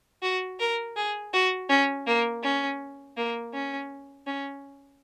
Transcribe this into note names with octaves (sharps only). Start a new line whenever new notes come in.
F#4
A#4
G#4
F#4
C#4
A#3
C#4
A#3
C#4
C#4